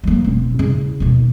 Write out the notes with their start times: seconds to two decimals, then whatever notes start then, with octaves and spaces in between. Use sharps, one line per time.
0.04 F#3 A#3
0.24 E1 C4
0.59 C#3 E4
1.00 D#2 B2